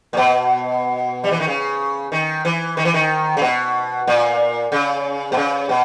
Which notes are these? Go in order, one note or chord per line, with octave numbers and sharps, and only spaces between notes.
A#2
B2
G3
E3
D#3
C#3
D#3
E3
D#3
E3
D#3
C#3
B2
A#2
C#3
B2
C#3
B2